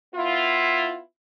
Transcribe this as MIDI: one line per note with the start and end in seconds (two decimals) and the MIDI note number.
0.14 1.00 59
0.14 1.00 64
0.14 1.00 65